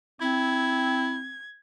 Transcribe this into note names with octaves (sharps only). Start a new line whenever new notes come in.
C4 E4 G#6